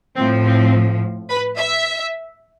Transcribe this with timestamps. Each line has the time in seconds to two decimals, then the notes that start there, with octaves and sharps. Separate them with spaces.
0.16 A2 F3 C4
0.45 C4
1.30 B4
1.59 E5